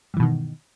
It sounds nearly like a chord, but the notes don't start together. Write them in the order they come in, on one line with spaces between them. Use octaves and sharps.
G2 E3 B2 D#3